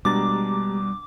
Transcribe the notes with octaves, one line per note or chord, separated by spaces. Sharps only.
B2 G3 G#3 D4 G4 A#5 D6 A6